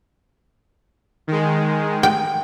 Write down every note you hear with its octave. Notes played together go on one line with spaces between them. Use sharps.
D#3 G#3
G5